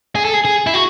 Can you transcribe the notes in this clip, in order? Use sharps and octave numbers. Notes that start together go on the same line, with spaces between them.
G#4
A4
G#4
G#4
E4
F#4